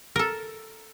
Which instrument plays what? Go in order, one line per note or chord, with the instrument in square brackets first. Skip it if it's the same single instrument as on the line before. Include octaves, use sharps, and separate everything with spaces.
[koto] A4 A#4